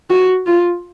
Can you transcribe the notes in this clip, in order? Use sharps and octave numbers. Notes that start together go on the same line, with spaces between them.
F#4
F4